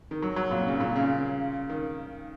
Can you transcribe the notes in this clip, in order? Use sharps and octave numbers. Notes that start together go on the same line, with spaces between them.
D#3
F#3
F#3
A#2
C#3
A#2
C#3
D#3